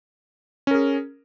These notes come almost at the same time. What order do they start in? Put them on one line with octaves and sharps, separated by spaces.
C#4 A#4 G#4